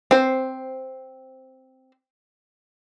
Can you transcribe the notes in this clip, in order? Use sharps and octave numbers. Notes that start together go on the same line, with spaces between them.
C4 C5